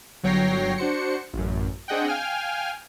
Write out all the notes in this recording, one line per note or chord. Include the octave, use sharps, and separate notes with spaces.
G1 F#3 C#5 G5 A#6 C7
D4 F#4 C5 C#7
A1 F#2
C4 D4 G#4 D#5 F#5 G5
F5 G5 G#5 F6